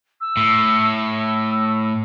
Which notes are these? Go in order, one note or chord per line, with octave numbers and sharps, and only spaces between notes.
E6
A2